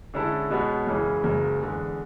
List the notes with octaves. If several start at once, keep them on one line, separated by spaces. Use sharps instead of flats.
D3 G#3 C#4 E4 A4
B2 G#3 B3 F#4 C#5
F#2 C#3 E3 G#3 C#4
F#1 F#2 C#3 G#3
E2 D3 G#3